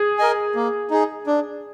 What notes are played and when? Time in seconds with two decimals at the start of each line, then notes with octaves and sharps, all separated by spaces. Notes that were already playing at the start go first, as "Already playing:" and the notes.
Already playing: G#4
0.18 A#4 D#5 G#5
0.55 A#3
0.91 D#4 G#4
1.27 D4